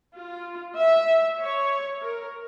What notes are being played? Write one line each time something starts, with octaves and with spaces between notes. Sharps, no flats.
F4
E5
C#5
A#4